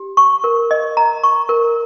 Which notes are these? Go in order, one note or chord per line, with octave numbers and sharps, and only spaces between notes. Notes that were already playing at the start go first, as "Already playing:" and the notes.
Already playing: G4
C#6
A#4
D#5
A#5
C#6
A#4